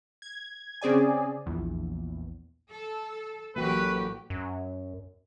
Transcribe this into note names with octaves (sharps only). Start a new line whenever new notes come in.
G#6
C#3 C4 G#4 D5 G#5
A#1 E2
A4
A1 F#3 A#3 F#4 G4 B4 G5 C#6
F#2